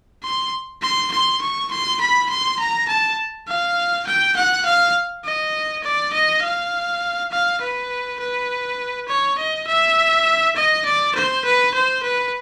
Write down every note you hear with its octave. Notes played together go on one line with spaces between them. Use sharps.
C6
C6
C6
C#6
C6
B5
C6
A#5
A5
F5
G5
F#5
F5
D#5
D5
D#5
F5
F5
B4
B4
C#5
D#5
E5
D#5
D5
C5
B4
C5
B4